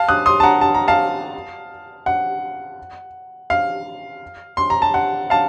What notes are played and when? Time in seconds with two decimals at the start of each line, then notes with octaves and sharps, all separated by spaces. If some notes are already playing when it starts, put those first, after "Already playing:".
Already playing: F5 A5
0.09 D#6 F#6
0.26 C6 D#6
0.40 A5
0.43 F#5 A#5
0.61 A5
0.75 A#5
0.88 F5 A5
2.06 F#5
3.50 F5
4.57 C6
4.70 A#5
4.82 A5
4.94 F#5
5.30 F5 A5